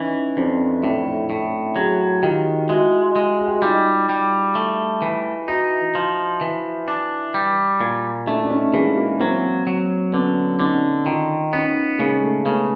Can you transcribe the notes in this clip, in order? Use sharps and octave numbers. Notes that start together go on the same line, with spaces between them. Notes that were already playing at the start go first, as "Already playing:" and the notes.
Already playing: E3 C#4 D#4
F2 C4 D4
A2 D4 E4
A2
F#3 F#4 G#4
D#3 F4 G4
G#3 E4 F#4
G#3
G#4
G4
F#4
G3 D#4 F4
G3
A3
E3
D#4 E4 F#4
F3
E3
D4
G3
A#2
A3 D4 E4
D4
C#4 D#4
E3 G#3 A#3
G#3 A#3
F#3 A#3 C4
F#3
D3 B3 C#4
D3 C#4 D#4
D#3 D#4 F4
B3 C#4 D#4
C#3 G#3 A#3
A3
C#3 A3 B3